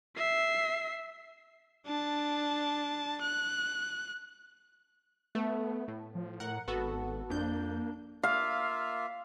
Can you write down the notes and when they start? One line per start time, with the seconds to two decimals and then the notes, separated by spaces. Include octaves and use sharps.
0.18 E5 C7
1.86 D4 A5
3.21 F#6
5.35 A3 B3
5.88 A2
6.15 F3
6.40 A2 A#4 F#5
6.68 G#1 B3 F#4 A4
7.30 F2 A#3 D4 G6
8.23 A#3 F4 E5 F5